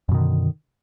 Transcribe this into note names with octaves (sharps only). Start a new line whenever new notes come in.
F#2 B2 D3 D#3